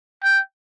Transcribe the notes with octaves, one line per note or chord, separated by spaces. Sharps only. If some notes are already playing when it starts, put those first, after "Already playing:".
G5